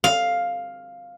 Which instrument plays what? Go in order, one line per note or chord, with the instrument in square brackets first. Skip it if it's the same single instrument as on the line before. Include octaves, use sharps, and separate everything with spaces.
[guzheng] F5